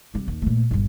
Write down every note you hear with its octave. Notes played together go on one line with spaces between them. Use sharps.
C3 G3
D#2
A#2 A3
G1 G3